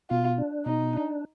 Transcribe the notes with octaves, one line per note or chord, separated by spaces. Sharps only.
B2 F4
D4
B2 D#4
D4